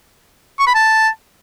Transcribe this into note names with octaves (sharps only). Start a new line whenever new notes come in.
C#6
B5
A5